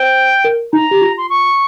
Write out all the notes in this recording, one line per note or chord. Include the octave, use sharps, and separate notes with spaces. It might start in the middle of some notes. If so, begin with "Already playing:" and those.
Already playing: C5 G5
A#4
D#4 A#5
G4
F4
C6
C#6